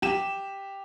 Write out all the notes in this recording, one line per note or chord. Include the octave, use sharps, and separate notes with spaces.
G4 E7